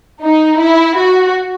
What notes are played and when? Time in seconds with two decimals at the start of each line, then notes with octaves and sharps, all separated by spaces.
0.22 D#4
0.60 E4
0.98 F#4